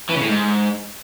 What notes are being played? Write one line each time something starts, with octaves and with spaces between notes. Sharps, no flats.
E3
C#3
A2
G#2